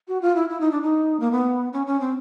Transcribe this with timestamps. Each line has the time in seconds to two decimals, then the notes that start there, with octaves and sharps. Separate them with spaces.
0.08 F#4
0.22 F4
0.36 E4
0.49 E4
0.60 D#4
0.71 D4
0.82 D#4
1.20 A#3
1.32 B3
1.73 C#4
1.87 C#4
2.01 C4